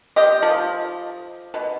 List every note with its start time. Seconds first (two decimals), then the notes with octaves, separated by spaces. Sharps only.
0.16 G4 D#5
0.42 F3 A3
1.54 B2